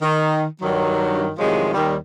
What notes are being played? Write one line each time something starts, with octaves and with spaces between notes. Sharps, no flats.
D#3
G2 D#3 F#3
A2 C3 D#3 F3 F#3 G#3
D#2 D#3 G3